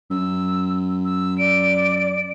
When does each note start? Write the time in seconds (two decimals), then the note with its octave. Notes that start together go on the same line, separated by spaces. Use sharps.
0.11 F#2 E6
1.05 E6
1.38 D5 D7